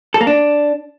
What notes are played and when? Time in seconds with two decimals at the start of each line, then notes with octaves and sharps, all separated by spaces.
0.14 A4
0.21 A#3
0.27 D4